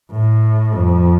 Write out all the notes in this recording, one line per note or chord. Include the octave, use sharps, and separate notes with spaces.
A2
F2